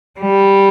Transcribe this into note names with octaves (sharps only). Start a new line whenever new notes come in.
G3